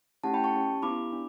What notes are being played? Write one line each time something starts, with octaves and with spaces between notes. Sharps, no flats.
A3 C#4 E4 G4 F#5 A5
G5 B5
A5 C#6
C#4 G4
B3 E4 G4 B5 D6
D4